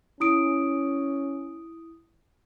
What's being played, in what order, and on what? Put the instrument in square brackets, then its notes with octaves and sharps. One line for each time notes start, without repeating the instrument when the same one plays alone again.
[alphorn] C#4 [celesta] E4 D#6 D7